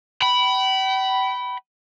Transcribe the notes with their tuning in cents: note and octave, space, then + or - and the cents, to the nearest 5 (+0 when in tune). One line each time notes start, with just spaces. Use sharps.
G5 -40 B5 +0